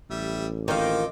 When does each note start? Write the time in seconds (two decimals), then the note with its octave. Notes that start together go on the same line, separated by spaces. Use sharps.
0.10 A1 G3 E5
0.68 D#3 F3 A#3 C4 D#4 F5 G5 D6